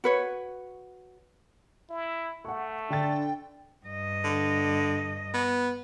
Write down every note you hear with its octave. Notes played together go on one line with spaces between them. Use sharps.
F#4 B4 C#5
E4
A3 F#5 C#6
D3 D4 G5 A6
G2 D#5
D3
B3